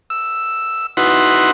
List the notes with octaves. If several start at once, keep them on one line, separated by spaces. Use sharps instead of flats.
E6
D#4 E4 F#4 B4 F#5 C6